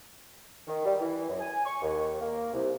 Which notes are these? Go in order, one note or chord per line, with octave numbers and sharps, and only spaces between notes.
D#3
G3
E3
F#2
G#5
C#6
D#2
A#3
C2